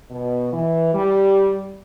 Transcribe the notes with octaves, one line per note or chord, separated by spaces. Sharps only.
B2
E3
G3